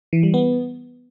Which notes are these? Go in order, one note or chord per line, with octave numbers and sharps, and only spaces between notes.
E3
G3
B3